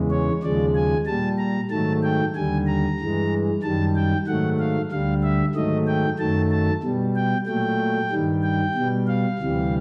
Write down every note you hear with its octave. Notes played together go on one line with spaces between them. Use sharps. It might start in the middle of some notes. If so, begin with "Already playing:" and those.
Already playing: E2 C#3 E3 G#3
C#5
D#2 C#3 F3 G#3 D5
G#5
A#2 G3 A5
A#5
G#2 D#3 F#3 A3 A5
G5
D#2 D3 G3 G#5
A#5
G2 E3 G#3
F#2 D#3 G3 A5
G5
G#2 D#3 F#3 A3 F#5
F5
D2 D3 G3 F5
E5
G#2 D#3 F#3 A3 D#5
G5
F#2 D#3 F#3 A3 A5
A5
B2 G3
G5
A#2 F#3 A3 G5
G2 D#3 G3
G5
B2 G3
F5
D2 C3 E3 G3